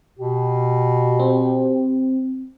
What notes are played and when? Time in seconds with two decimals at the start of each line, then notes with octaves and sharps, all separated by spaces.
0.19 B2 G4
1.20 C4